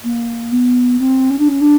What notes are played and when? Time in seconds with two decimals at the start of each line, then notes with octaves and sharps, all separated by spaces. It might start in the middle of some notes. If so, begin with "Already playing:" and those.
0.04 A#3
0.51 B3
0.99 C4
1.30 C#4
1.38 D4
1.48 C#4
1.61 D4